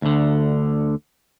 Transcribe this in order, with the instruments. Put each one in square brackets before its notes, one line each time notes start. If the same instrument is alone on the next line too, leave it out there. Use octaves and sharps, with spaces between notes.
[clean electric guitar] D2 D3